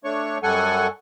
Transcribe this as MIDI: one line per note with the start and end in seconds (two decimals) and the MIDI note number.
0.04 0.38 57
0.04 0.38 62
0.04 0.38 73
0.04 0.38 85
0.43 0.87 42
0.43 0.87 55
0.43 0.87 69
0.43 0.87 78
0.43 0.87 80
0.43 0.87 85